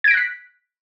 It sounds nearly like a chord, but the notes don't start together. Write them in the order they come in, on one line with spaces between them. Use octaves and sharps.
G#6 D7 A#6 F#6 B6